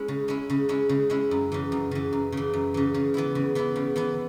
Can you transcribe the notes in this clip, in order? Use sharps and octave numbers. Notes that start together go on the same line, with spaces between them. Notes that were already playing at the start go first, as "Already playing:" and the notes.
Already playing: G#3 C#4 E4
C#3
G#3 C#4 E4
C#3
G#3 C#4 E4
C#3
G#3 C#4 E4
F#2
C#3 E3
F#2
C#3 E3
F#2
C#3 E3
F#2
C#3 E3
C#3
E3 B3 E4
C#3
E3 B3 E4
C#3
E3 B3 E4